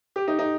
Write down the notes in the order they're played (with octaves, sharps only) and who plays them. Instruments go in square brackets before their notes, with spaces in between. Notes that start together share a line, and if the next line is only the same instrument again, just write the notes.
[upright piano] G4
D#4
D#4